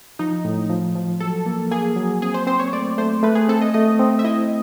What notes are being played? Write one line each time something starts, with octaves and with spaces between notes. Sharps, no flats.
F3 D#4
A2
F3
F3
F#3 A4
A#3
A#3 G#4
F#3
C4 G#4
C5
C4 C5
C#5
A3 D5
A3 C5
A3 B4
G#4
C4 A4
D#5
A3 D#5
C4
E5
E4 D#5